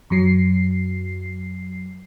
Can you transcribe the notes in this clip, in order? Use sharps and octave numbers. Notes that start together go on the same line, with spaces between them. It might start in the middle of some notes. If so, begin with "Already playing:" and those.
F#2 F#3 C7